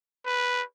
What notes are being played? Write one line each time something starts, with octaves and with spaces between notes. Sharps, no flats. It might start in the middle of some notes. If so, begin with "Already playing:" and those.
B4